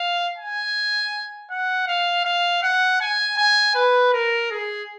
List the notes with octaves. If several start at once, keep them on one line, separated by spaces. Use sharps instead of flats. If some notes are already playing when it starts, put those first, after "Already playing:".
Already playing: F5
G#5
F#5
F5
F5
F#5
G#5
G#5
B4
A#4
G#4